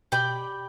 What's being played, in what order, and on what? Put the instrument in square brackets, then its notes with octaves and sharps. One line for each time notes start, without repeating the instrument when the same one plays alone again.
[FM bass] B2 [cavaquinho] G4 D5 G5 B5